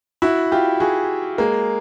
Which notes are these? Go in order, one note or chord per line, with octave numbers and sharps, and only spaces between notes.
E4 F#4
F4 G4
F#4 G#4
G#3 A#3